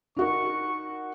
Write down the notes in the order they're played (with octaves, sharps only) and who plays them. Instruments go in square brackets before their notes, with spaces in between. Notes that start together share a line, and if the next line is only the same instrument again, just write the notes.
[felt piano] D#4 F#4 A#4 [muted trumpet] C#6